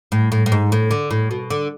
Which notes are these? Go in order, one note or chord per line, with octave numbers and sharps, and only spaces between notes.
A2
A2
A2
G#2
A2
D3
A2
B2
D3